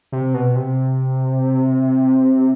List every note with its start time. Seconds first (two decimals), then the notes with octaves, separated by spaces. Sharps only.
0.12 C3
0.34 B2
0.56 C3